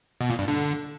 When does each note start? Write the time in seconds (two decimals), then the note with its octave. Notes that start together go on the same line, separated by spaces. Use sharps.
0.21 B2
0.30 A#2
0.39 G2
0.48 D3